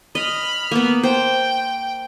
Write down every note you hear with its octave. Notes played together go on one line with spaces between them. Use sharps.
D#5 B5 F6
A#3 B3
C5 G5